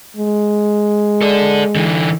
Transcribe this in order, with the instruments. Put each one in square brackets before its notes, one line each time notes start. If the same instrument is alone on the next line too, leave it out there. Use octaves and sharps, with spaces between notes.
[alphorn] G#3
[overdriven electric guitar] A4 D5
D3 E3